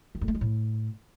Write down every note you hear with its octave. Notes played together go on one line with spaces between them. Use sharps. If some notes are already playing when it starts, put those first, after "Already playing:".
D#3
G2
A3
G#3
A2